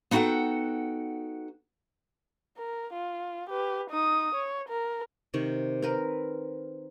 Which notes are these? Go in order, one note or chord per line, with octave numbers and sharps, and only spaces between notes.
B3 D#4 F#4 A4 F#5 G5
A#4
F4
G4 B4
D#4 D#6
C#5
A#4
C3 D#3 C#6
C4 A#4 B4